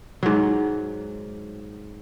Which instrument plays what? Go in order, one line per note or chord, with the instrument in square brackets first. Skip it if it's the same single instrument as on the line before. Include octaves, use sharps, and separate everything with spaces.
[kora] G#2 F#3